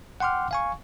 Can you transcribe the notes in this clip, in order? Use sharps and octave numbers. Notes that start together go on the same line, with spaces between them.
F#5 G5 C6 D6 F6
F5 G#5 C#6